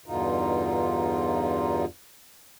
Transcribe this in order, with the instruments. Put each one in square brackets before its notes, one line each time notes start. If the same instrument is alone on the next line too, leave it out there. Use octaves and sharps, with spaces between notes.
[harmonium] E2 G2 B2 D3 D#4 F4